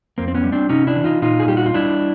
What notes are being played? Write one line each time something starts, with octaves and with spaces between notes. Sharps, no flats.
F2 A#3 C4
C4
B3 C#4
G3
C4 D4
C3 C#4 D#4
D4 E4
E3
D#4 F4
A#2 D#4 F4
G#4
G3 G4
F#4
F4
G3 D4 E4